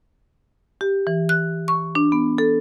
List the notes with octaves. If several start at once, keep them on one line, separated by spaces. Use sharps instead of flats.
G4
E3
F#6
C#6
D4
B3
A4